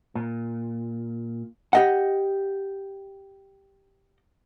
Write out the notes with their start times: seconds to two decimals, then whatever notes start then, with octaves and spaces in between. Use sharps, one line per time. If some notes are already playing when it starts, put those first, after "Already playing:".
0.15 A#2
1.73 G4 D#5 F#5